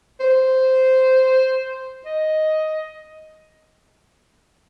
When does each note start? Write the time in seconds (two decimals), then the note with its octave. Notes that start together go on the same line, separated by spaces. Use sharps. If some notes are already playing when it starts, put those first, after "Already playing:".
0.20 C5
2.05 D#5